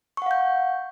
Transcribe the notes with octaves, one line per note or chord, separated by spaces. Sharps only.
F5 F#5 C#6 G6